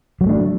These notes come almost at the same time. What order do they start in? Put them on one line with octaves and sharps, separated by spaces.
F#3 G#3 A3 D4